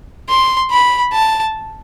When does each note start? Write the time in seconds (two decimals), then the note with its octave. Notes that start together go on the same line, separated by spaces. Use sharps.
0.29 C6
0.71 B5
1.13 A5